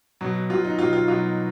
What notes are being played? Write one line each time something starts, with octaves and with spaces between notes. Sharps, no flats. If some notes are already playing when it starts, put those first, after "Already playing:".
B2 F#3
B2 F#3 F4
D#4
B2 F#3 F4
F4
B2 F#3 F4